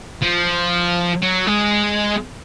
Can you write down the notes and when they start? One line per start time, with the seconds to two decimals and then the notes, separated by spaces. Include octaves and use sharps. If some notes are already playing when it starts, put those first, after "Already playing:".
0.23 F3
1.22 F#3
1.46 G#3